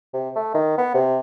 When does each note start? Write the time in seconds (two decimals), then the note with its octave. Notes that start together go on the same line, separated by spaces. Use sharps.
0.13 C3
0.36 A3
0.54 D#3
0.78 B3
0.94 C3